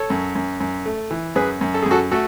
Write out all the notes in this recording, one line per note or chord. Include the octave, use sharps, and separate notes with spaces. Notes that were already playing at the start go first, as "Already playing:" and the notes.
Already playing: A4 C#5
F#2
F#2
F#2
A3
E3
F#2 G#4 B4
F#2
A4
F#2 G#4
F#4 A4
A3 F#4 A4